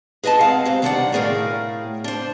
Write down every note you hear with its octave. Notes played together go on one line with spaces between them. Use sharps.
G#4 B4 D#5 F#5 A5
G#3 C4 F5 F#5
G#2 C3 C5
D#3 G3 D4 C5 D5 F#5
A2 A3 G#4 A#4 F5 G5
D4 C5